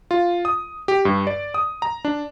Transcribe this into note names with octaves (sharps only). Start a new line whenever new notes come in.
F4
D#6
G4
G2
D5
D#6
A#5
D4